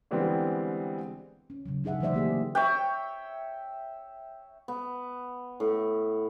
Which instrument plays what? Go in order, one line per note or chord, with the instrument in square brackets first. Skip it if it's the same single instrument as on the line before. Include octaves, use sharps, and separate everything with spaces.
[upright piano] D3 E3 G3 G#3 B3 C4
[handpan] C#4
C#3 F#3
D3 D#4 G#4 E5 F#5
E3 F#3 A3 C5 D5 E5
A#3 G4 G#4
[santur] C#5 E5 G5
[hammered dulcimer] B3
A2